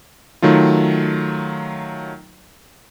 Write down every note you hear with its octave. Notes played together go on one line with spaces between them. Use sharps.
D#3 F#3 A3 F4